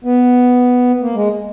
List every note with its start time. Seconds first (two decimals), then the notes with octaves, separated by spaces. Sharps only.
0.04 B3
1.01 A#3
1.15 G#3